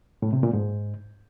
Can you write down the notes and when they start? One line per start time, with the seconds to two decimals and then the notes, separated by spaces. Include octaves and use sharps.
0.22 A2
0.33 C3
0.43 A#2
0.53 G#2